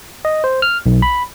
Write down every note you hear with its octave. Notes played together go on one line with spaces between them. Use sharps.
D#5
C5
F6
B1
B5